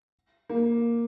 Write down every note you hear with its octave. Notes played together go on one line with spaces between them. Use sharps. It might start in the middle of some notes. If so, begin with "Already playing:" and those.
A#3